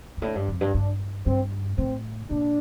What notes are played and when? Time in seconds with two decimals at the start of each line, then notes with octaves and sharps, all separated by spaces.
0.17 G2
0.22 A2 D4
0.35 G2
0.48 F2
0.61 G2
0.74 G2 D4
1.26 G2 C4
1.78 A2 C4
2.31 A#2 D4